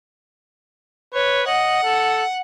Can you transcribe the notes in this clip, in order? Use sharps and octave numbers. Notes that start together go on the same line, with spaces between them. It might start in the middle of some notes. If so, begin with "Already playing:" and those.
B4 C#5
D#5 F#5
A4